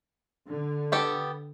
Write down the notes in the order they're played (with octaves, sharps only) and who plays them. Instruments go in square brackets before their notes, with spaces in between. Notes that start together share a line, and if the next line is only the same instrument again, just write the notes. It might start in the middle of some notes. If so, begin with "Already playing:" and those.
[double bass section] D3
[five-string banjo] B3 G4 A4